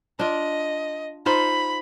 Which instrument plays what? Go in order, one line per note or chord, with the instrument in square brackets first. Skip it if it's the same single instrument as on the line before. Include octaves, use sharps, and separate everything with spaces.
[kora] D4 F4 [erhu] D#5
[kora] D#4 F4 C5 [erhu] B5